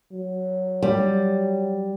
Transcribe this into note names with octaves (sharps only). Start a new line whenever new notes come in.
F#3
G3